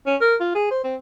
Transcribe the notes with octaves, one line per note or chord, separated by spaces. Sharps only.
C#4
A#4
F4
G#4
C5
C4